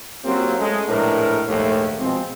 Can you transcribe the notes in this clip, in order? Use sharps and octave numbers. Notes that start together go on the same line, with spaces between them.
F#3 A#3 C4 C#4 F4 G4
G#3 A3 C#4
A#1 A2 G#3 D4 A#4 B4
A#1 D#2 G#2 A3
B2 F3 G#3 C4